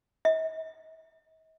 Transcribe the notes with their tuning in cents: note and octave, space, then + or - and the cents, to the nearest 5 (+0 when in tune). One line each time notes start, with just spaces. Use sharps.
D#5 +45